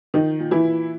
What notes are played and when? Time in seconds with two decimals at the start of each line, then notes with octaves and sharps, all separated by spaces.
0.14 D#3 F3 D#4
0.39 A#2
0.51 E3 E4
0.64 A#2